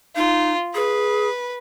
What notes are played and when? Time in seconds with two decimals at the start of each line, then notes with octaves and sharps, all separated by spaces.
0.16 D#4 F4
0.75 G#4 B4